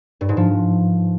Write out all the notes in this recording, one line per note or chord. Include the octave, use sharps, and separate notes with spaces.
G2
G#2
F3